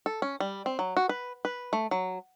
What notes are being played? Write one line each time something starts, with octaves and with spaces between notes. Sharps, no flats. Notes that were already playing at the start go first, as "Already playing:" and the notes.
A4
C#4
G3
C4
F#3
F#4
B4
B4
A3
F#3